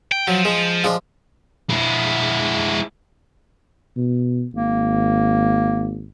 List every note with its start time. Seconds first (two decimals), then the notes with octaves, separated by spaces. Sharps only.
0.12 G5
0.28 F3 F#3
0.45 G#3
0.84 F3 G#3 D4
1.70 G#3 E4
3.97 B2
4.54 G#1 A#3